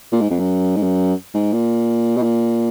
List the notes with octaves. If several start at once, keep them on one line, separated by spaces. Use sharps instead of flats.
A#2
G#2
F2
F#2
G#2
F#2
G#2
A#2
B2
A#2